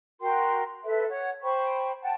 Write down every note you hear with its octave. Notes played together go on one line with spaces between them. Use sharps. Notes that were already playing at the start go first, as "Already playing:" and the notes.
F#4 A#4 G5 C6
A4 B4 E5
C#5 F#5
C5 G5 B5 C#6
F#5 G5 A5